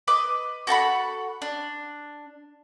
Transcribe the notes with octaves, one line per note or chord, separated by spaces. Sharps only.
B4 D#5 D6
F#4 A4 F#5 B5
D4